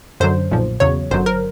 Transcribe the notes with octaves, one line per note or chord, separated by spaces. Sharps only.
F#2 D3 F#3 C5
B1 A#2 F3
E2 C#3 F#3 C#5
G1 F#2 D3 F#3 C5
A#4